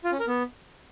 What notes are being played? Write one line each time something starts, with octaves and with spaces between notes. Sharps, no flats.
F4
C#4
A#4
B3